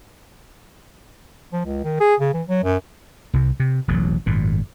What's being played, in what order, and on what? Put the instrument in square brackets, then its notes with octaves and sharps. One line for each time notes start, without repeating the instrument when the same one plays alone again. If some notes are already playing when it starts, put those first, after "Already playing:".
[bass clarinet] F3
C#2
D#3
G#4
C#3
E3
F#3
F#2
[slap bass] C2 C3
C3
E1 A1 E2 F#3
G#1 F#2 A#2